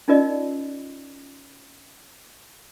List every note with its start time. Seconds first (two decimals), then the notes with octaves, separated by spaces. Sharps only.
0.08 C#4 D#4 F4 A#4 D5 D#5